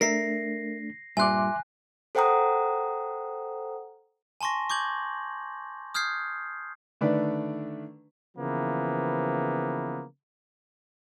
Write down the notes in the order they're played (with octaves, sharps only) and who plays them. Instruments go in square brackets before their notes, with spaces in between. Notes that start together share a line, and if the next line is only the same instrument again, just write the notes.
[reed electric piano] A3 D4 [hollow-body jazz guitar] A#4 E5 [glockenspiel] A#6 C7
[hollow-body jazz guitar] G2 A#2 [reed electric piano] E5 C6 D6 [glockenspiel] G#5 F#6
[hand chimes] A4 C5 F#5 G5 A#5 D#6
[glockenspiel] G#5 A5 C6 C#6 A#6
C#6 D6 G6 G#6 F#7
D#6 F6 G6 G#6 C7
[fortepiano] D3 D#3 A3 D4 B4 D5
[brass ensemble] C#3 E3 F3 A#3 B3